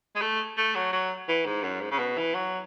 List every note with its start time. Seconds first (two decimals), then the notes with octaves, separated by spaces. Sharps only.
0.16 G#3
0.21 A3
0.57 A3
0.75 F#3
0.92 F#3
1.28 E3
1.46 G#2
1.63 F#2
1.81 G#2
1.91 C#3
1.99 B2
2.18 E3
2.34 F#3